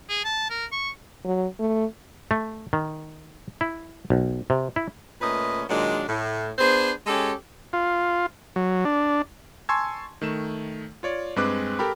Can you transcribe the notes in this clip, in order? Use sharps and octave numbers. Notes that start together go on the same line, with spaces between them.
G#4
A5
A#4
C#6
F#3
A3
A3
D#3
E4
B1
C3
E4
A#2 A3 C#4 B4 D#5
A#2 D#3 F#3 G#3 D4
A2
B3 D4 G#4 C5
G#3 C#4 G4 A4
F4
F#3
D4
G#5 A5 C6 C#6 E6 G#6
D#3 A3 E7
F4 C#5 D5
G2 G#3 C4 B4 D6 F#6
G4 A4 A#4 G5 B5